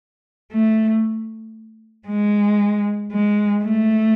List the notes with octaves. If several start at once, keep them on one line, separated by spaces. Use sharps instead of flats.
A3
G#3
G#3
A3